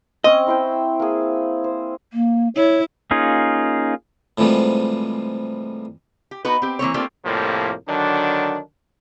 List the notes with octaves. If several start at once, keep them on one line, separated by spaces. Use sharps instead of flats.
C4 C#4 D#5
E4 C5 G5
A#3 G#4
C5
A#3
E4 C#5
A#3 C#4 D#4 F4 G#4
A2 C3 E3 F3 G3 G#3
G4
B3 D#4 F#4 B4
C4 G4
E3 A#3 C4 C#5
A3 A#3 C4 D4 F4 G4
C2 F2 A2 F3 G3 A#3
D3 D#3 F#3 D4